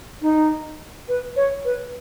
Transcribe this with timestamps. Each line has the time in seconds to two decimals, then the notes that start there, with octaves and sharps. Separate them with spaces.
0.22 D#4
1.08 B4
1.36 C#5
1.65 B4